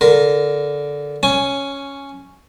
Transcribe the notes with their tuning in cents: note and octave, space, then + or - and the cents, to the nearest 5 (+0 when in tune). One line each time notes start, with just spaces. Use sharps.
D3 -20 A#4 +0
C#4 +0 G#5 +15